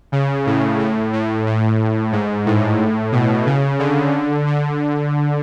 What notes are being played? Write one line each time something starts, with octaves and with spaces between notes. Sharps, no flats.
C#3
A2
A2
A2
A2
G#2
A2
B2
C#3
D3
D3